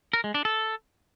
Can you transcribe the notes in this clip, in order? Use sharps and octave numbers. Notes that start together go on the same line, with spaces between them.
A#4
G#3
D4
A4